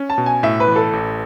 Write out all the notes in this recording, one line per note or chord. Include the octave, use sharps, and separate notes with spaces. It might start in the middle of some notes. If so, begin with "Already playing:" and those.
Already playing: C#4
A5
B2
G#5
A2 E5
B4
E3
A4
A1